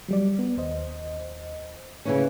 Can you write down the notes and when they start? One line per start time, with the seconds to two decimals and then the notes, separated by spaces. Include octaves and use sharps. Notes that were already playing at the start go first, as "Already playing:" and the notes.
0.08 F#3 G3 D5
0.39 B3
0.57 D#2 C5 D#5
2.05 C#3 E3 C#4